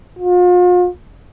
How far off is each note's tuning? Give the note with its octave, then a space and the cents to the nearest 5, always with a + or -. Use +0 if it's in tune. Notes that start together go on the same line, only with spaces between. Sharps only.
F4 +40